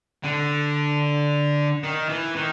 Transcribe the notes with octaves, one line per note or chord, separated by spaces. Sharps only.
D3
D#3
E3
D#3